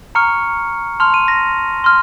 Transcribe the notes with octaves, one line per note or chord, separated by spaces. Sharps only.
A#5 C#6 F6 C#7
A5 C6 F6 F7
D#7
A#6
C6 F6